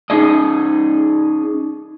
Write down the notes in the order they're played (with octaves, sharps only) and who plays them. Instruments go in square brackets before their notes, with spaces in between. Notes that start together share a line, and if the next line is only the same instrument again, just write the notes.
[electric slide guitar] C#4 D#4 G#4 D5 D#5